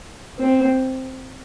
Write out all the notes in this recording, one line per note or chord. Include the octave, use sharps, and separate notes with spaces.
C4